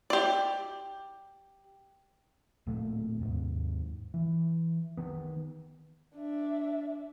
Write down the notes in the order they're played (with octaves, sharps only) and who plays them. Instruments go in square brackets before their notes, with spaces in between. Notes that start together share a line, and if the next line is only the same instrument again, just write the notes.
[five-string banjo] G4 D5
[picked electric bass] D1 A#2 A3
D#2 G#2
E3
D#3 B3
[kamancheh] D4 E5